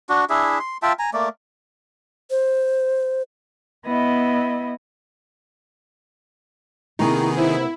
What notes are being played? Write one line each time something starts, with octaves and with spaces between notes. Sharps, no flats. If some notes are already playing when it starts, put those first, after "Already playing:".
D4 F#4
D4 E4 G#4 E5
C6
F4 E5 G5 A5
G#5 A#5
A3 A#3 D5
C5
B3 E4 D#5
C3 D#3 A#3 B3 E4 G#4 A#5 C#6
E4 C5